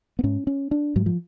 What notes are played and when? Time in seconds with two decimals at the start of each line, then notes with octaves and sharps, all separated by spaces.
0.19 B3
0.23 G#2 C#4
0.47 C#4
0.71 D4
0.96 G#2 F#3
1.06 F3